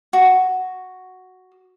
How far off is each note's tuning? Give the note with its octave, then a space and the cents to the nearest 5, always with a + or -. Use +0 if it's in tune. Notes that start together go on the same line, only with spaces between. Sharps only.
F#4 +0